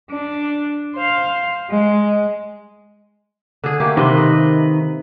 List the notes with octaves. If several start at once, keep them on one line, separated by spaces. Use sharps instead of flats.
D4
C5 F5
G#3
D3 G#4
A3 A#3 G4
C3 D#3 B4 C6
C3 D#5